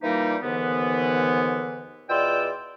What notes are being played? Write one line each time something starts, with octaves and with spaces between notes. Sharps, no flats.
A#2 E3 G3 A#3 D#4 G4
D#2 G#2 D3 E3 B3
E2 B2 F4 D5 G5 E6